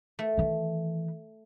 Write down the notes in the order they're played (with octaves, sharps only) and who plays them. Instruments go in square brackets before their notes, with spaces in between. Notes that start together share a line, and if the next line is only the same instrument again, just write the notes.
[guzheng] A3
[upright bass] D#3 E3